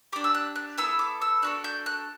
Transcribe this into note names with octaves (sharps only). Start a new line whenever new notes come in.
D4 G4 D6
E6
F#6
F#6
B3 E4 A4 E6
D6
E6
D4 F#4 A4 F#6
G6
F#6